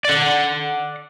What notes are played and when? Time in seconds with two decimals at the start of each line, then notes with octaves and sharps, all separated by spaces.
0.05 D5 F#5